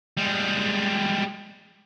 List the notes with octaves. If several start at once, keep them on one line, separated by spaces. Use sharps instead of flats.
G3 G#3